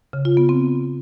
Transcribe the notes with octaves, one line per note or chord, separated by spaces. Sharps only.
C#3
F4
B3
C4